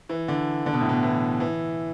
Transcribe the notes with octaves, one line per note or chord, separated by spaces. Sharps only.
E3
D3
D3
B2
A2
B2
E3
E3